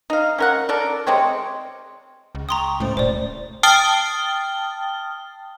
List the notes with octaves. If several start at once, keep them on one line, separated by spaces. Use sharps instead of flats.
D#4 F5
C#4 A#4 F#5
A4 A#4 D5
C3 G#3 C4 C#5
C#2
G5 A#5 C6 C#6 D#6
A2 G#3 C#4 C5
D1 B2 A3 C5 D5
G5 A5 D#6 F6 A6 G7